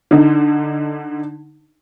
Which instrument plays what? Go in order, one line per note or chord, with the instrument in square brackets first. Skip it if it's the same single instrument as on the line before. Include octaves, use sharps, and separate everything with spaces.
[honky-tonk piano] D3 D#4